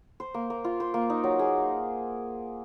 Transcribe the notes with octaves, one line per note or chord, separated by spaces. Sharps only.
C5
A#3
A#3
F4
C5
A#3
D#4
F#3
G#4